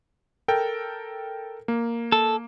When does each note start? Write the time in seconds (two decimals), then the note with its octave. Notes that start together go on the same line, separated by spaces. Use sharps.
0.48 A4 A#4 G5
1.68 A#3
2.12 A4